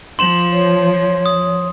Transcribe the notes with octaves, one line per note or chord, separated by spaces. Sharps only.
F3 C6 E7 F#7
C#5
D#6